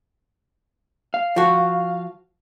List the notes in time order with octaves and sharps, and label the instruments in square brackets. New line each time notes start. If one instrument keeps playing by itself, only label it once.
[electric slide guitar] F5
[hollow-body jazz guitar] F3 F#4